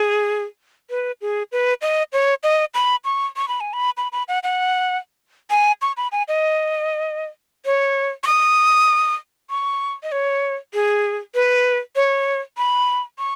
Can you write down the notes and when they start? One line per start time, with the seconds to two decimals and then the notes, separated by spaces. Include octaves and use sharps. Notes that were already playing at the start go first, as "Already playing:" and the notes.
Already playing: G#4
0.90 B4
1.21 G#4
1.52 B4
1.82 D#5
2.13 C#5
2.43 D#5
2.74 B5
3.05 C#6
3.36 C#6
3.48 B5
3.60 G#5
3.73 B5
3.97 B5
4.12 B5
4.28 F#5
4.43 F#5
5.50 G#5
5.82 C#6
5.97 B5
6.12 G#5
6.28 D#5
7.66 C#5
8.24 C#6
8.27 D#6
9.50 C#6
10.03 D#5
10.12 C#5
10.74 G#4
11.35 B4
11.96 C#5
12.57 B5
13.19 C#6